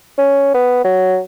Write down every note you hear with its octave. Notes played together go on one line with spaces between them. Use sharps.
C#4
B3
F#3